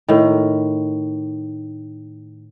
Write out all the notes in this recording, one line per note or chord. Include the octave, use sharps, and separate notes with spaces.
A2 D#3